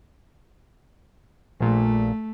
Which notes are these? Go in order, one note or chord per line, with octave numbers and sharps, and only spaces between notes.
A#1 A#2 A3